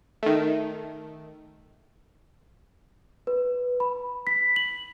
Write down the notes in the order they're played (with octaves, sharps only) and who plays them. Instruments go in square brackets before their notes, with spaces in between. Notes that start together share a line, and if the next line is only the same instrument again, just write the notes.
[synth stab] D#3 A3
[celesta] B4
B5
B6
F#7